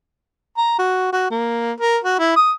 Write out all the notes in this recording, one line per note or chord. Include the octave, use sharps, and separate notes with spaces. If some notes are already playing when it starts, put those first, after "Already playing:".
A#5
F#4
F#4
A#3
A#4
F#4
E4
D#6